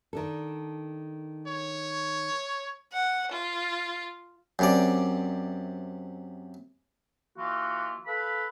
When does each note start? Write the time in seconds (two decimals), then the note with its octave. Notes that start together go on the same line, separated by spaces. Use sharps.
0.13 D#3 D4 A4
1.48 C#5
2.93 F#5
3.31 F4
4.59 F#2 C3 D5
7.37 E3 A#3 F4 F#4
8.06 A4 B4 F5 B5